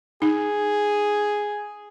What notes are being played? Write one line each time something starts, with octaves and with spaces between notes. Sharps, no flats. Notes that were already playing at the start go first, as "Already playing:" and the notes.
D#4 G#4